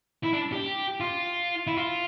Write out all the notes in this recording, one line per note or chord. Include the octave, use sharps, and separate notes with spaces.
E4
D4
G4
F4
E4
F4